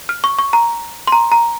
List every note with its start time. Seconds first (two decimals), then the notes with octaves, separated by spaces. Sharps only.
0.09 F6
0.24 C#6
0.38 C#6
0.53 A#5
1.07 C6
1.12 A#5
1.32 A#5